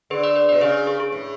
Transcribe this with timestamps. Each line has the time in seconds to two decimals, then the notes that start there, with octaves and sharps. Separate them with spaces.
0.10 D3 G#4 B4
0.24 B4 D5
0.36 B4 D5
0.49 B2 B4 D5
0.61 C#3 G#4 B4
0.87 G#4
1.00 G#4
1.12 A2